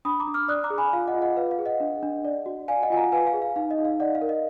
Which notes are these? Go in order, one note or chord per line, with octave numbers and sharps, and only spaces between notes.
D4 B5 D#6
A#5 D6
D4
D6 F6
D5 D#6 F#6
A#5 D6
G#4
G#5 B5
F4 F5
D#5 F#5
F4
D#5 F#5
B4 F5
F5
G#4
D#5 F#5
D4
D4
D5
F#4
D5 F5 G#5
D#5 F#5
F4 G#5
F#5 A#5
B4 F5 G#5
F5
G#4
F5
D#4 F5
D#5
D#4
F5
D5 D#5 F#5
F5
A#4
D#5